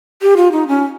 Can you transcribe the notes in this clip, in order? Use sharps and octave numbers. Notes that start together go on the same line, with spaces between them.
G4
F4
D#4
C#4